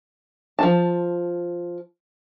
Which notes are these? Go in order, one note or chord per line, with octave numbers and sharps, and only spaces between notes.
F3 A5